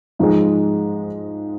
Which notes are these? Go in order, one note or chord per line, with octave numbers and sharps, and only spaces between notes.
G#2 F3 G#3